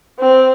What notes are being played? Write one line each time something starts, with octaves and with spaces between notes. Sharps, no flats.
C4